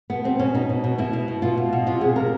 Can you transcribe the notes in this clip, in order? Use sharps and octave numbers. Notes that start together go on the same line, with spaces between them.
B2 B3
B2 C4
B2 C#4
B2 D#4
B2
B2
B2 E4
B2
B2
B2 F4
B2
B2
C3 F4
C3 G#4
C3 A#4